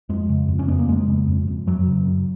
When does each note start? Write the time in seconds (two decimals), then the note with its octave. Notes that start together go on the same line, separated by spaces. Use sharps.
0.09 F2 G#3
0.29 C#3
0.48 F2
0.59 C#4
0.68 C#3 B3
0.79 A#3
0.88 F2 G#3
1.08 C#3
1.28 F2
1.48 F2
1.67 F#2 F#3
1.87 C#3
2.07 F#2